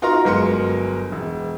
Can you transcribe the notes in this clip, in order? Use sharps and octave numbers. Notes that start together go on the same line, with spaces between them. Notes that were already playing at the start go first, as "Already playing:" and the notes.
D#4 F4 F#4 A#4 A#5 C6
G1 F#3 G#3 A#4 C6 C#7
E1